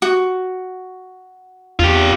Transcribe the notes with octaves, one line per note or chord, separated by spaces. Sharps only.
F#4
E2 F4 G4